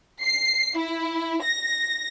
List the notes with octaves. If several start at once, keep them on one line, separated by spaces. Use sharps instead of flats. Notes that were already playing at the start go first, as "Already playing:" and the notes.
C7
E4
A#6